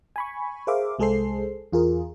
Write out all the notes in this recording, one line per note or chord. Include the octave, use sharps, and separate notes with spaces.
G#5 B5 C#6
G#4 A#4 C5 E5 F5 D6
C2 G#3 G#4 A4 C5 C7
E2 F4 G#4 A#4